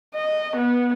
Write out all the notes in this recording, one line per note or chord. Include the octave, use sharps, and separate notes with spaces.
D#5
B3